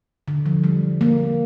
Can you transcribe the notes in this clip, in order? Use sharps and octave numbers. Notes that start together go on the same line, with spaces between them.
D3
F3
G3
A#3